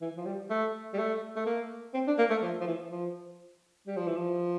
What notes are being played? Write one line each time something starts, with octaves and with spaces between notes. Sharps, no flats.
E3
F3
G3
A3
G3
A3
A3
A#3
C4
D4
A#3
A3
F3
F3
E3
F3
G3
F3
E3
F3